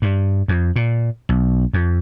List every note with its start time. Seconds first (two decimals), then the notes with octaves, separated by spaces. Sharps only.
0.02 G2
0.48 F2
0.76 A#2
1.29 B1
1.73 F2